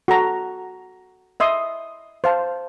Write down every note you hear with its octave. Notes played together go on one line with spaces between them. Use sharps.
F#4 A4 A#5
D#5 E5 C6 D#6
C5 F5 A5